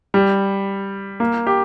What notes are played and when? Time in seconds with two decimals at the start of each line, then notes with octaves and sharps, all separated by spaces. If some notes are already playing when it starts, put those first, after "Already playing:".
0.14 G3
1.20 A#3
1.47 G4